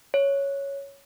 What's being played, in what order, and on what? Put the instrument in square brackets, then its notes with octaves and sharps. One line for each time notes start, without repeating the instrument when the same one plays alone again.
[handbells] C#5